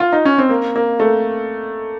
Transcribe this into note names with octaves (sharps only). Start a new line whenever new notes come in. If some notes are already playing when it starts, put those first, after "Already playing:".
F4
D#4
C#4
C4
A#3
A#3
A3